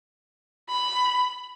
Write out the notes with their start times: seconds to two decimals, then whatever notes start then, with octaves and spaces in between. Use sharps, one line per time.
0.69 B5